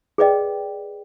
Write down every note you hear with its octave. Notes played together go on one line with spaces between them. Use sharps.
G#4 B4 D5 D#5 G5